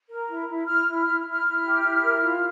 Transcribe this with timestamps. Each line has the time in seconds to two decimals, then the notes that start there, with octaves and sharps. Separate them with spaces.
0.09 A#4
0.28 E4
0.48 E4
0.67 E4 F6
0.86 E4
1.00 F6
1.06 E4
1.26 E4 F6
1.45 E4
1.64 G4
1.83 E4
2.02 A#4
2.21 F4